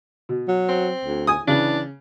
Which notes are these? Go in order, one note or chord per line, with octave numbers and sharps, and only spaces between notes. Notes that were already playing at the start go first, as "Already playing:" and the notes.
B2
F#3
C4
D2
G#5 D#6
C#3 E3 D4